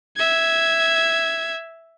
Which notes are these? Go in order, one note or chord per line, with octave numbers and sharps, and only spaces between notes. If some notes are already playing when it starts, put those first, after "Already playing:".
E5 G#6